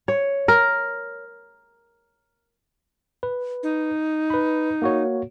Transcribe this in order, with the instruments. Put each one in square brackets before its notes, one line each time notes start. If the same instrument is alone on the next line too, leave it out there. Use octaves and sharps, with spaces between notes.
[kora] C#5
A#4
[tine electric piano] B4
[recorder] D#4
[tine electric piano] B4 B5
A#3 F#4 C#5